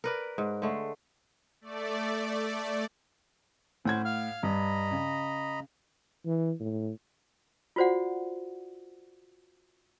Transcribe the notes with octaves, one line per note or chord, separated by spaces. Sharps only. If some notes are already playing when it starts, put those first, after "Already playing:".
A#4 B4 D5
G#2
D3 G#3 A3
A3 D5
A2 C#4 C5 F#5 G#6
F5 F6
G2 D#5 A#5 B5
C#3
E3
A2
F4 F#4 C5 D5 F#5